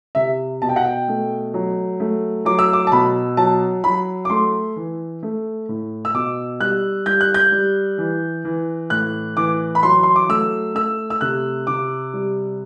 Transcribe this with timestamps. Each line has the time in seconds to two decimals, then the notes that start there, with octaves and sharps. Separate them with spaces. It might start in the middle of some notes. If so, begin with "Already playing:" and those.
0.15 C3 E5
0.62 B2 A5
0.69 G5
0.76 F#5
0.84 G5
1.08 A3
1.54 F#3
2.00 A3
2.45 F#3 D6
2.59 E6
2.73 D6
2.87 A5
2.92 B2 B5
3.37 F#3 A5
3.84 F#3 B5
4.25 D6
4.30 A3 C6
4.76 E3
5.23 A3
5.69 A2
6.05 E6
6.14 B2 D6
6.60 G3 F#6
7.06 G3 G6
7.21 F#6
7.34 G6
7.52 G3
7.98 E3
8.45 E3
8.90 A2 F#6
9.37 E3 D6
9.75 B5
9.83 F#3 C6
10.03 C6
10.16 D6
10.29 A3 E6
10.75 A3 E6
11.10 E6
11.21 C3 F#6
11.67 C3 D6
12.13 G3